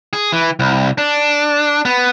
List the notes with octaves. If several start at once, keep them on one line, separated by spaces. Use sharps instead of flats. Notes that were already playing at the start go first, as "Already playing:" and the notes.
G#4
E3
C2
D4
B3